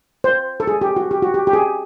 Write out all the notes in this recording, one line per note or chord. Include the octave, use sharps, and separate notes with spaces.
C5
A4
G#4
G4
F#4
G4
F#4
G4
G4
G#4